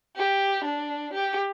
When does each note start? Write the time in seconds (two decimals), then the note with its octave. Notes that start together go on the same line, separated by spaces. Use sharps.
0.16 G4
0.65 D4
1.13 G4